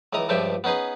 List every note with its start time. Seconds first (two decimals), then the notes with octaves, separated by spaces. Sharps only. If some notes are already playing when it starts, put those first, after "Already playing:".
0.13 C#2 E3 D#5 A#5 D#6
0.29 C#2 G2 F3 G4 E5 G5
0.64 B3 C#4 D#4 G#4 B4